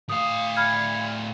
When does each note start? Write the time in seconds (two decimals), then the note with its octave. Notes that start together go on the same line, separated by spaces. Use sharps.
0.09 A2 F5 D#6
0.56 B5 F6 G#6